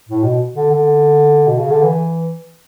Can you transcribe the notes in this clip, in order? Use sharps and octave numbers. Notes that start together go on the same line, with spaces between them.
A2
B2
D3
D3
B2
C#3
D3
E3